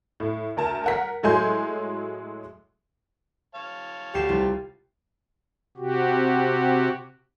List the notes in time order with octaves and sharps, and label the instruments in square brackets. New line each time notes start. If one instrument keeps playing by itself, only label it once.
[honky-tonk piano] A2
D2 A#4 A5
A#4 F#5 B6
A2 F#3 G#3 G#5 C6 G6
[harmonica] C#5 F5 A5
[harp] D2 C7 E7 [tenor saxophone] G4
[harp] C2 F4
[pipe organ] C3 F#4 G4